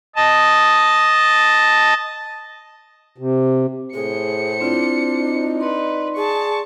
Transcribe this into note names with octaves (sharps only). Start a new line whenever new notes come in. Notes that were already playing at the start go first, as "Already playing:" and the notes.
D#5 A5
C3
A2 G#4 C5 C#7
C4 D4 E4 F4
D#4
B4 D5 C6
G#4 A5 C#6